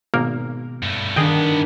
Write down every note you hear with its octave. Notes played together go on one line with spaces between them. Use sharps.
G#1 B2 A#3 A#4
G2 A3
G2 D#3 B3 D4 G#4 D#5 G5